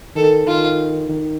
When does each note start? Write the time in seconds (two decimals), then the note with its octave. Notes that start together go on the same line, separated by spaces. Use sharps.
0.16 D#3 A4
0.47 D#3 F4
1.09 D#3